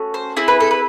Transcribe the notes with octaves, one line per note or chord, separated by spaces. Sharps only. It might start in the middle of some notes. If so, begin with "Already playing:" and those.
Already playing: A3 C#4 F#4
C5
C4 E4 G#4
B4
A4
B4